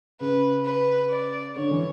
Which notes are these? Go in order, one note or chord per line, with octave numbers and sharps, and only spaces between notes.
C#3 B4
B4
D5
D3 C#5
E3